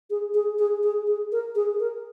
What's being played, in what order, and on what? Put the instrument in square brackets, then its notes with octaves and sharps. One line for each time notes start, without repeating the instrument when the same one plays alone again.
[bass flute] G#4
G#4
G#4
G#4
G#4
A#4
G#4
A#4